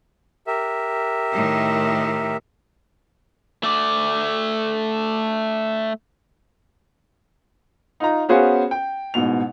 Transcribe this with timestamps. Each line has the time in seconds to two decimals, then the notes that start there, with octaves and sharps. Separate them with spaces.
0.47 G4 A#4 E5
1.32 A2 D#3
3.64 A3 D5
8.00 D#4 F4 A#5
8.29 B3 C#4 F#4 G#4 C5 F5
8.71 G5
9.14 A1 G#2 B2 F7